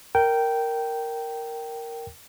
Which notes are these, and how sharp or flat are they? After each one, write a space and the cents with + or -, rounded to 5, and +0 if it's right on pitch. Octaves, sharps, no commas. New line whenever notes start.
A#4 -5 G5 -10